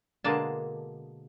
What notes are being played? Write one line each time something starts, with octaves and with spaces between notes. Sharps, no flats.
B2 D3 G#3 A#3 D4 A5